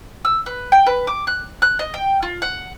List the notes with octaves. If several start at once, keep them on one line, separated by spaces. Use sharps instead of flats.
E6
B4
G5
B4
D6
F#6
F#6
D#5
G5
F4
F#5